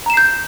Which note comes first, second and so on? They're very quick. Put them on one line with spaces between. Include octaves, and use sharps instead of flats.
A#5 E7 C7 G6